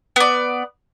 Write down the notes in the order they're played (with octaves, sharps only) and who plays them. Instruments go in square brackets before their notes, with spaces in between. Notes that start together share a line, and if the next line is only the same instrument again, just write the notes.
[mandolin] B3 D5